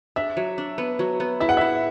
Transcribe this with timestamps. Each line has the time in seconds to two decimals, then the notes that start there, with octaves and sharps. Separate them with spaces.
0.16 D4 E5
0.37 F#3
0.58 D4
0.78 B3
0.99 F#3
1.20 B3
1.40 E4 E5
1.49 F#5
1.57 E4 E5